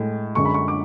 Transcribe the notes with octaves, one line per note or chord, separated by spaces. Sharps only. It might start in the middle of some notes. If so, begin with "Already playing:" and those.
Already playing: A2 G#3
F#2 D3 G#3 C#6
B5
C#6
D6